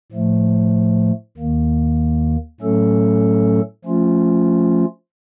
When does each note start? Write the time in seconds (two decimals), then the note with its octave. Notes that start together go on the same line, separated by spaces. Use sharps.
0.12 A2 F3 A3
1.37 D#2 D#3 A#3
2.60 A2 F#3 A3 C#4 A4
3.85 F3 A3 C#4 F4